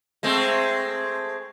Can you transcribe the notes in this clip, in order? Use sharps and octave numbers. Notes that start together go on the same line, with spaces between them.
G#3 A3 C4